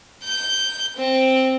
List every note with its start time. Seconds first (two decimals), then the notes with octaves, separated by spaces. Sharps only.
0.24 G6
0.97 C4